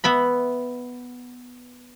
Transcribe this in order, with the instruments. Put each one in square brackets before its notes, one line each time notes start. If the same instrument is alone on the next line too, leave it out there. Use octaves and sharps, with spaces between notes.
[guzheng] B3 E5 B5